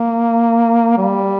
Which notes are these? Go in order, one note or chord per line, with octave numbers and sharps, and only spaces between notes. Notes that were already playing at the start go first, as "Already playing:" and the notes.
Already playing: A#3
G3